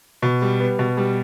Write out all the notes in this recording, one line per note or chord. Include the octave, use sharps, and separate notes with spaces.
B2
G3
B3
B2
G3